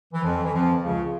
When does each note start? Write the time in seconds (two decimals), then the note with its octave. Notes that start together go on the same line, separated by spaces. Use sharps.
0.14 E3
0.23 F2 F3
0.44 E3
0.53 F2 F3
0.82 C#2 C#3